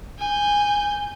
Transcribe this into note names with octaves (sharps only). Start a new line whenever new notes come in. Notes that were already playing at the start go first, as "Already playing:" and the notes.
G#5 G6